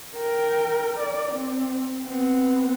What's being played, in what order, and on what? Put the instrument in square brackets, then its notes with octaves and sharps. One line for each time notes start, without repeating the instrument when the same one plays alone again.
[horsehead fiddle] A#4 G5
D5
C4
B3 C4